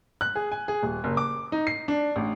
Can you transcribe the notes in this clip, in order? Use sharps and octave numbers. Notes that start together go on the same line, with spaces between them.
F#6
G#4
G#5
G#4
D#1
F#1
D6
D#4
C7
D4
A1